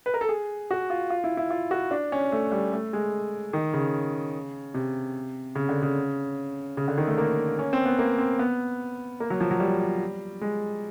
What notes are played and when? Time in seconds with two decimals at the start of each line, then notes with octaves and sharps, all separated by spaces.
0.06 B4
0.14 A#4
0.21 A4
0.29 G#4
0.71 F#4
0.90 F4
1.10 F4
1.24 E4
1.37 E4
1.50 F4
1.71 F#4
1.91 D4
2.12 C#4
2.32 A3
2.52 G3
2.73 A3
2.93 G#3
3.53 D#3
3.74 C#3
4.74 C3
5.55 C#3
5.69 D3
5.82 C#3
6.77 C#3
6.88 D3
6.98 D#3
7.07 A3
7.18 A#3
7.59 C#4
7.73 C4
7.85 B3
7.99 A#3
8.18 C4
8.39 B3
9.20 A#3
9.30 F#3
9.40 F3
9.51 F#3
9.60 G3
10.41 G#3